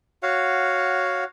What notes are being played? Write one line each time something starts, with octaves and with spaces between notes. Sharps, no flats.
F#4 C#5 F5 F#5